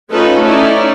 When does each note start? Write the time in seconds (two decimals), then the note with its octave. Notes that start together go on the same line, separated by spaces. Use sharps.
0.11 A3 C#4 D#4 F4 A4 B4
0.42 C#4 D#4 E4 D5